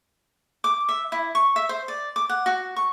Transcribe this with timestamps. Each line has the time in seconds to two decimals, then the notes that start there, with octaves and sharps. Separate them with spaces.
0.64 D6
0.89 E5
1.12 E4
1.35 C#6
1.56 E5
1.69 C5
1.88 D5
2.16 D6
2.29 F#5
2.46 F#4
2.76 C#6